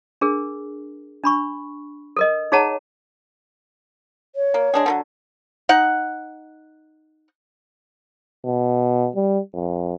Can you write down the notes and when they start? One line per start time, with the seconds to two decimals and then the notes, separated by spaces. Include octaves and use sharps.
0.21 D4 G#4 A#4
1.24 D4 B5 C#6
2.17 A4 A#4 D#5
2.52 D#4 G#4 C#5 F#5 A5 A#5
4.36 C#5
4.54 A#3
4.74 G#3 D4 G#4
4.86 D3 F3 F#3
5.69 D#4 F#5
8.45 B2
9.16 G3
9.54 F2